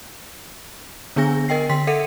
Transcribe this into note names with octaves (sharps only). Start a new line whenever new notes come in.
D3 B3 D4 G#4 G#5 A#6
A#4 D#5 G5 C7
D3 G5 C6 B6
A4 E5 F#5 C#7 D#7